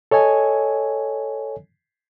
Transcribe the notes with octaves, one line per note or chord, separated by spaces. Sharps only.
A4 C#5 D#5 G#5